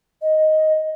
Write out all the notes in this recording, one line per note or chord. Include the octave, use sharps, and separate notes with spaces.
D#5